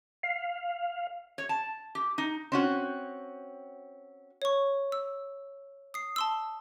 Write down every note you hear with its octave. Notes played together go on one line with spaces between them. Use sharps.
F5
C#5
A5
G4
D#4
C4 C#4 F#4
C#5 C#6
E6
D#6 C7
A5 C6 E6